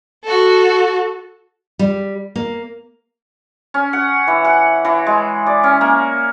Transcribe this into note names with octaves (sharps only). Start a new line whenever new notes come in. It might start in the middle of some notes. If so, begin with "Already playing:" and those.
F#4 A4
G3
A#3
C#4
F#5
E3
F#5
E3
G#3
D5
C#4
A#3